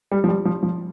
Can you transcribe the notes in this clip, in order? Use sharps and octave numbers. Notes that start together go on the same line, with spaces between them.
G3
F3
G3
F3
F3